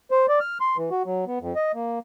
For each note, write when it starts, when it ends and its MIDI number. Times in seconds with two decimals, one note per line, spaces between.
0.11 0.26 72
0.29 0.39 74
0.40 0.58 89
0.61 0.77 84
0.77 0.90 52
0.91 1.03 66
1.05 1.25 54
1.27 1.39 59
1.41 1.54 41
1.56 1.72 75
1.74 1.99 58